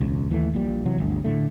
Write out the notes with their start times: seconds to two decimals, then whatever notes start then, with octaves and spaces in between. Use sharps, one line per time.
0.01 E1 C#2
0.30 D#2 E3 F3 A3
0.54 A#1 A#2 G3
0.85 C3 E3 F#3
0.98 G1 D2
1.24 A2 D3 A3